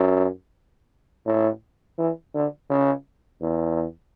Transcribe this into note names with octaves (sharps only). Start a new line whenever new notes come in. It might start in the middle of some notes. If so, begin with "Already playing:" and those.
Already playing: F#2
A2
E3
D3
C#3
E2